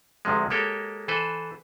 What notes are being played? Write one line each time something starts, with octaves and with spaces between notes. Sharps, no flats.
D2 C3 F3 G#3
G#3 A#3 G4 A4 C#5 G5
E3 A4 B4 C5